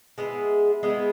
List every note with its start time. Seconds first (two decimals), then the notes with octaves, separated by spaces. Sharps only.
0.18 G#3 B3 E4 G#4
0.83 G#3 B3 E4 G#4